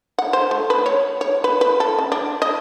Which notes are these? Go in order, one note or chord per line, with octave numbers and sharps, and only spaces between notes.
F#5
C5
A3
B4
C#5
C#5
B4
B4
A4
C#3
D4
D#5